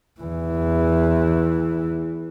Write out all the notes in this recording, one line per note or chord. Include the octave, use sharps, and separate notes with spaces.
E2 E3